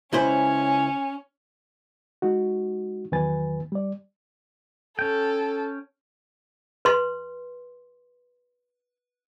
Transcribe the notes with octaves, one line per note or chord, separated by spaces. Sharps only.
C#2 C#4 E4 C5 G#5
G#3 D#4 F#4
E2 D#3 F#3 B4 G#5 A6
G3 D5
C#4 A4 G5
B4 C6